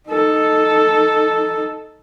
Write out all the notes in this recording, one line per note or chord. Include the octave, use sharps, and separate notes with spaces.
D#4 A4